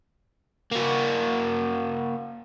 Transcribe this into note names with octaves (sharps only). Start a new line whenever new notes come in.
A#3 F#4